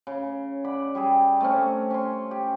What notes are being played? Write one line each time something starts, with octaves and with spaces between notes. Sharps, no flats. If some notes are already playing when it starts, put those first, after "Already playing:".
C#3
D5 F#5 B5
G3 G4 G#4
A3 C4 C#4
C#4 C6
G4